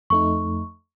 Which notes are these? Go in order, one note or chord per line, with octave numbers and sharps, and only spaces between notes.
F2 A3 D#4 C#6